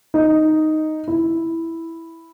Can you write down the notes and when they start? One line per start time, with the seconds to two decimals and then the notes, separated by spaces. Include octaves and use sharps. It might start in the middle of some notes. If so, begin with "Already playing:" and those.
0.14 D#4
1.08 E4